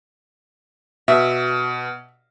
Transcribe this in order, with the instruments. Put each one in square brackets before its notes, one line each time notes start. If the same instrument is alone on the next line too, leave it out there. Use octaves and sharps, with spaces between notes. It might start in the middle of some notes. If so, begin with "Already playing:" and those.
[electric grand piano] B2 [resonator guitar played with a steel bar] E5